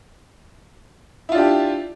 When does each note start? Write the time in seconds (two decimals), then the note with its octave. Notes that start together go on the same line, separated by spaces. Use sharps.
1.29 E4
1.32 F4
1.35 D4
1.38 G4